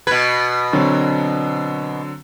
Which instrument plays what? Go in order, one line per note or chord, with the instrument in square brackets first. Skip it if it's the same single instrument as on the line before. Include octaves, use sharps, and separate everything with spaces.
[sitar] B2 B4 [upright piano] G#6
[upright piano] D3 F#3 C4